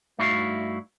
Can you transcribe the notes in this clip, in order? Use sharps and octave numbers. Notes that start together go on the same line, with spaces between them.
G2 A3 D#4 E4 F#4 F5